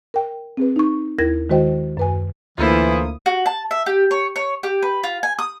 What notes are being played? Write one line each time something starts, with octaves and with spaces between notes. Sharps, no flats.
A#4 G5
C4 G#4 B4
D#4 C#6
D#2 E4 A#4 G#6 A#6
D#3 G#3 F#4 C5 D#5 G5
F#2 B4 G#5
D2 E3 A#3 E4 F4 A4 C5 D#6
F#4
A5
E5
G4
C#5
C#5
G4
B4
F4
G#5
D#6